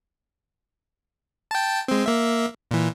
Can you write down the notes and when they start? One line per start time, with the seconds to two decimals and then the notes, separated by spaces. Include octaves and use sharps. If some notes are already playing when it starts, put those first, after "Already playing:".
1.51 G5 A5
1.88 G#3 C4
2.06 A#3 E5
2.71 A#2 E3